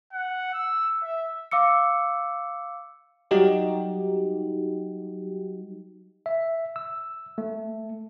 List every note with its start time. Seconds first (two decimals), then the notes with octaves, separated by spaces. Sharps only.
0.13 F#5
0.53 E6
1.02 E5
1.51 F5 D6 E6 C#7
3.31 F#3 G3 D#4 F#4 G4
6.26 E5
6.76 E6
7.38 A3